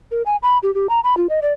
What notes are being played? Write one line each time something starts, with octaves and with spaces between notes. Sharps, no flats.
A#4
G#5
B5
G4
G4
A#5
B5
F4
D#5
D5